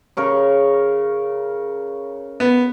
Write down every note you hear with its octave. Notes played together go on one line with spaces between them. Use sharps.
C#3 A#4 C#5
B3